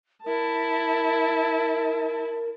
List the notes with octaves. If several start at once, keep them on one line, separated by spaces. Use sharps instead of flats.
E4 A#4 A5